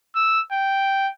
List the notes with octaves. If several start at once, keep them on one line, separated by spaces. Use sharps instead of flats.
E6
G5